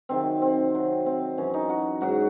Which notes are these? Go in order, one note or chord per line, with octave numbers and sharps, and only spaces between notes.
C3 D#3 F#3 C4
C4
C3 F#3
C4
F#2 E3 C#4
D#4
F#4
G#2 F#3 F#4